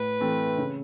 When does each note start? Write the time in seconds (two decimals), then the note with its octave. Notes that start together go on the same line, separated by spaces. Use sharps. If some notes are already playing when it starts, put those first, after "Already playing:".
Already playing: A2 B4
0.20 E3 A3 C4
0.58 C#3